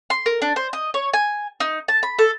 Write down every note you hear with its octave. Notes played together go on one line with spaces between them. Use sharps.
C6
A#4
D4
C5
D#5
C#5
G#5
D#4
A5
B5
A4